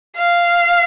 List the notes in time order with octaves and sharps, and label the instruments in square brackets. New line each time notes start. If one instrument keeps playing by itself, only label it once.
[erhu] F5